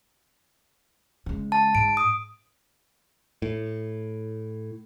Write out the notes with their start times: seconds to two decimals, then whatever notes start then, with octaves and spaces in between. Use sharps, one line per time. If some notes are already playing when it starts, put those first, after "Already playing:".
1.26 C#3 G#3
1.52 A5
1.75 G#2 D7
1.97 D#6
3.42 A2